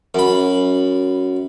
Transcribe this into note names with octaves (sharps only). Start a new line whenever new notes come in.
F#2 B5